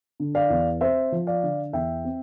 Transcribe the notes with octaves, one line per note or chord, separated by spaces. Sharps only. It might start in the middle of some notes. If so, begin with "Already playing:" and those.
D3
D5 F5
E2
C4 C5 E5
F3
D5 F5
D3
E2 E5 G5
C4